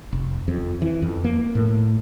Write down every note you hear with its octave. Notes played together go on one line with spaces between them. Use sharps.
F1
F2
E3
F2
A#3
A2